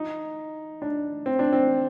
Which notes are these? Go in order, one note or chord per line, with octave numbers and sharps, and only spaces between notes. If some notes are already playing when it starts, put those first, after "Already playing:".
Already playing: D#4
D4
C4
D4
C4